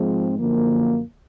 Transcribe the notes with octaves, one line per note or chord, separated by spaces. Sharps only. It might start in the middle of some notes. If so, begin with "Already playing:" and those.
Already playing: G#2 F3 G#3 C4
F#2 D3 F3 A#3